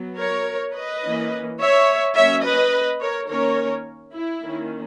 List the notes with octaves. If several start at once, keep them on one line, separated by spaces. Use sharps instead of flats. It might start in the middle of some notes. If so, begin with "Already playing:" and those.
Already playing: F#3 B3
A#4 C#5
B4 D#5
E3 A#3 C#4
C#5 E5
F#3 A#3 C#4 C#5 E5
B4 D#5
A#4 C#5
D#3 A#3 C#4 A#4 C#5
E4
D#3 A#3 C#4